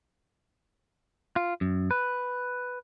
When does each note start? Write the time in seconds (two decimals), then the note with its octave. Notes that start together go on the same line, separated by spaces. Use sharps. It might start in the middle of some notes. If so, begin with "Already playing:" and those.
1.36 F4
1.61 F#2
1.91 B4